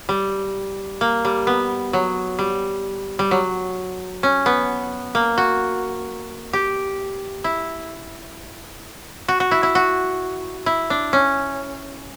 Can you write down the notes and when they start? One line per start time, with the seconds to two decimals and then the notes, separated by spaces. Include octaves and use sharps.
0.09 G3
1.01 A#3
1.25 G3
1.47 B3
1.93 F#3
2.39 G3
3.19 G3
3.31 F#3
4.23 C#4
4.46 B3
5.15 A#3
5.38 F#4
6.53 G4
7.44 E4
9.28 F#4
9.40 F#4
9.51 E4
9.63 E4
9.75 F#4
10.66 E4
10.90 D4
11.13 C#4